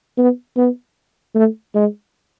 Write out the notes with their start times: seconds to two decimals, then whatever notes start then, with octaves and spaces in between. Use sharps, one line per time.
0.18 B3
0.57 B3
1.35 A3
1.74 G#3